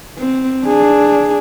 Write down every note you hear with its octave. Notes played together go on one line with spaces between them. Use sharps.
C4
D4 G#4